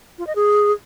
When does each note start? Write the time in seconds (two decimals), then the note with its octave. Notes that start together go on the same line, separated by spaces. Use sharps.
0.18 F4
0.27 D#5
0.36 G#4